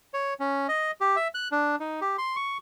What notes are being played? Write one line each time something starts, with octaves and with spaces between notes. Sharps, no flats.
C#5
C#4
D#5
G4
E5
F#6
D4
D#4
G4
C6
C#6